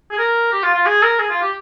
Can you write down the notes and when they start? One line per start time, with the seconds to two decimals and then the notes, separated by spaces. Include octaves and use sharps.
0.11 G#4
0.18 A#4
0.52 G4
0.63 F4
0.74 F4
0.86 G#4
1.03 A#4
1.19 G#4
1.30 F4
1.42 G4